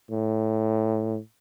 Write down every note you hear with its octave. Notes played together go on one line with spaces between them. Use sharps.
A2